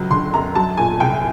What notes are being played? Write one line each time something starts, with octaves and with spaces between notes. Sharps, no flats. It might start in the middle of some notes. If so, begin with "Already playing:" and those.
Already playing: C#2 F#3
D3 C6
F#2 A#5
F#3 A5
A#2 G#5
C2 G5